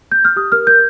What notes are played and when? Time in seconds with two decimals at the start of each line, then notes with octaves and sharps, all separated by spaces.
0.12 G6
0.25 F6
0.36 G4 D#6
0.52 A#4 F6
0.67 A#4 G6